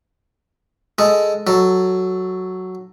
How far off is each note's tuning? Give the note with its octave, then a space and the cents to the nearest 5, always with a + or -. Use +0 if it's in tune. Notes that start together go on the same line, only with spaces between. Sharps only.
G#3 +0 A4 +0
F#3 +0 A4 +0